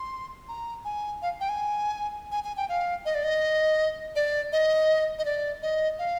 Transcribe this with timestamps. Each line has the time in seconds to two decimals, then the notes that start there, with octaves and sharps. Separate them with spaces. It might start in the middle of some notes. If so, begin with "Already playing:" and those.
Already playing: C6
0.48 A#5
0.85 G#5
1.22 F5
1.40 G5
1.49 G#5
2.32 G#5
2.44 G#5
2.57 G5
2.69 F5
3.05 D#5
3.15 D5
3.24 D#5
4.16 D5
4.52 D#5
5.19 D#5
5.25 D5
5.63 D#5
5.99 F5